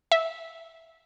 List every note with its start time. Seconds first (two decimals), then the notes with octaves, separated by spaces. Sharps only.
0.12 E5